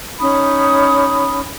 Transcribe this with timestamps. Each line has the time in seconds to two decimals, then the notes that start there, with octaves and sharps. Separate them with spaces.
0.19 C#4 D#4 B5 D#6